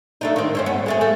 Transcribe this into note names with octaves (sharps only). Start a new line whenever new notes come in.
A3 D4 D#4
D#3 C4
G2 C4 C#4
B3
G#3 A3 G#4
A3